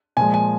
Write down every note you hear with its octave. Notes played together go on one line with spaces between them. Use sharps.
A#2 F3 G#3 G#5
G#5